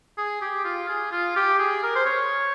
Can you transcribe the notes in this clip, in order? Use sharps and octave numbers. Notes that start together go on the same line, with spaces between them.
G#4
G4
F4
G#4
F4
G4
G#4
A#4
C5
C#5